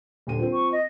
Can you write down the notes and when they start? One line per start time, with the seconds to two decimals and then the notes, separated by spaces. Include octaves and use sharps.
0.27 D#1 D3 D#7
0.39 F3 C4
0.53 C#6
0.72 D#5